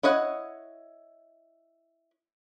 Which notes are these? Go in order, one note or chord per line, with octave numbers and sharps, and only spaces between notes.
E4 C#5 D#5 F#5